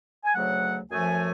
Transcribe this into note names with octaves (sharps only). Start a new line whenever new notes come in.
G#5
D2 C#3 F#3 A3 F#5
F#2 F3 A3 G#5